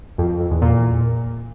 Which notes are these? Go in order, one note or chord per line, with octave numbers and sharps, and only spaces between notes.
F2
F2
F2
E2
A#2